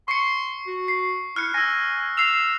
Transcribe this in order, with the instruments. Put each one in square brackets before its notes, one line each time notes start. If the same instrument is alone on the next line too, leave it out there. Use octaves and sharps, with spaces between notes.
[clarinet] C6 [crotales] C#6 C7 C#7
[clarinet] F#4
[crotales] C7
[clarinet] E4 [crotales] F6 F#6 C#7
[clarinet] G#5 [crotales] E6 A#6
[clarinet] E6 [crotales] C7 F7